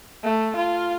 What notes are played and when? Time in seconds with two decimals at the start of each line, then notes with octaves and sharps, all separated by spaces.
0.23 A3
0.56 F4